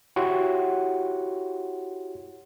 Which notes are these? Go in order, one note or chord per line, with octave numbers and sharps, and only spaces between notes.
E4 F#4 G4 C#5 F#5 C6